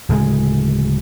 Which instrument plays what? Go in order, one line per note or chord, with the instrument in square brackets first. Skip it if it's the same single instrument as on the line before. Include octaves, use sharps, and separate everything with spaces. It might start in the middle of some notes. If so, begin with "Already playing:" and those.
[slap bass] D1 C#3 G#3